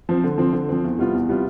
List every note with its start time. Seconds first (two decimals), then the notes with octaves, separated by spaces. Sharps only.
0.09 F3 C4
0.24 D3
0.38 F3 C4
0.53 D3
0.69 F3 C4
0.84 E2
0.99 C3 G3 B3 F4
1.13 E2
1.28 C3 G3 B3 F4